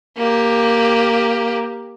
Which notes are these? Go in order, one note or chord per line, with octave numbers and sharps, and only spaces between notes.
A#3 G4